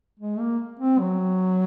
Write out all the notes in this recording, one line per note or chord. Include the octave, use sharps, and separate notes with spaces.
G#3
A#3
C4
F#3